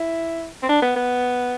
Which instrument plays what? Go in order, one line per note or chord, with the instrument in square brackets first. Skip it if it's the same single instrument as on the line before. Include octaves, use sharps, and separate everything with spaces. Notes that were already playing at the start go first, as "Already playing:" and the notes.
Already playing: [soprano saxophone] E4
C4
D4
B3
B3